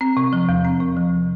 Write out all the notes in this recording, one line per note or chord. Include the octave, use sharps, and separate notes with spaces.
C4
C3
F3
E2
C4
C3
F3